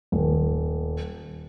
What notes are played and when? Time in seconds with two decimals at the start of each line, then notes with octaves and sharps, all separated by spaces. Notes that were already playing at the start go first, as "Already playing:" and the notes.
0.12 D#1